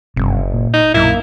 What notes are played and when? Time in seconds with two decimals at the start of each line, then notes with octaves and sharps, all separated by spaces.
0.16 F#1 G2 C3
0.54 A#2
0.74 D#4
0.94 B1 F#2 A#2 A#3 E4